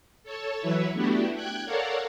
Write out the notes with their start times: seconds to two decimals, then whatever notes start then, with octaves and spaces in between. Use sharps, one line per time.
0.24 A4 C#5 A5
0.60 E3 F#3 E4 B4 C#5 E5
0.93 A3 B3 D4 E4 F#4 G4
1.34 G5 F#6 G#6
1.65 A4 A#4 C#5 D5 F5 F#5